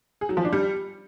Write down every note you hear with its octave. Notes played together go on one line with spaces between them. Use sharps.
G#4
F#3
F3
D4
G3